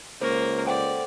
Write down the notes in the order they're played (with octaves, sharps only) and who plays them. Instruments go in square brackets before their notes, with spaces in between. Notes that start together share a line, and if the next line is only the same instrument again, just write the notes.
[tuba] C#2 [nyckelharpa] A#3 A#4 [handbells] C5 C#6
[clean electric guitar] A4 F#5 G5 [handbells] C5 [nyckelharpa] D5